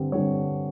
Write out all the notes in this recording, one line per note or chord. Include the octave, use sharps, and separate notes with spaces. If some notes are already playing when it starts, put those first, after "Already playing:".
Already playing: G2 D3 G3 C4
G2 D3 G3 C4 C#5